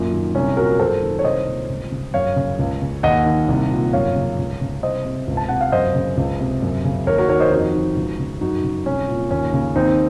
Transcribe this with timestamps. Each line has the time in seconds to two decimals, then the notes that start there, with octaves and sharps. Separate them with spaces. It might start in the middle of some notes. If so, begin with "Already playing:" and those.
Already playing: F#2 A#2
0.12 D#3
0.35 C2 C#4
0.57 A#2 F#4 A#4
0.79 F#2 A4 C5
1.01 D#3
1.19 C#5
1.24 C2 C5 D#5
1.46 A#2
1.69 C#2
1.92 C#3
2.14 F#2 C#5 F5
2.36 C#3
2.59 C#2
2.82 C#3
3.03 D#2 D#5 F#5
3.26 D#3
3.48 C2
3.71 A#2
3.93 F#2 C#5 F5
4.16 C#3
4.38 C#2
4.61 C#3
4.83 C2 C5 D#5
5.05 C3
5.28 C#2
5.37 A5
5.49 C3 F#5
5.61 F5
5.72 F#2 C5 D#5
5.95 C#3
6.17 C#2
6.40 C3
6.63 F#2
6.85 C#3
7.07 D#2 A#4 C#5
7.18 F#4 A#4
7.29 D#3 A#4 C#5
7.40 C5 D#5
7.51 F2 D#4 F#4
7.74 D#3
7.96 C#2
8.19 C#3
8.41 F#2 D#4 F#4
8.64 C#3
8.86 C2 C#4
9.09 A#2
9.31 D#2 C#4
9.53 C#3
9.76 D#2 C4 D#4